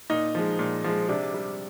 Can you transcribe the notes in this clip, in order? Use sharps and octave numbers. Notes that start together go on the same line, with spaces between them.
A#2 D#4
F3 G#3
A#2
F3 G#3
C3 D4
G3